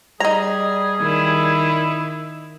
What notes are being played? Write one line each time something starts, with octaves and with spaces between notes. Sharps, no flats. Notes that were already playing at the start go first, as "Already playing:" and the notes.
G3 D#4 G#4 A#5
D#3 E4